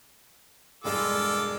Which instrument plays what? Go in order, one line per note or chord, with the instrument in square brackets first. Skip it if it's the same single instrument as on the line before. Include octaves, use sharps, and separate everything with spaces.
[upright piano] E1 G2 G#3 [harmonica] F4 A4 D6